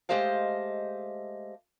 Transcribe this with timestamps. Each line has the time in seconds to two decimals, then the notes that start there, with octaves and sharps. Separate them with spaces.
0.09 G#3 A3 G4 C5 D#5 F5